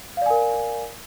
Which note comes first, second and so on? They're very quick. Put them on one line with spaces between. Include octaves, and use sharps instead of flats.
F5 D5 G#5 A#4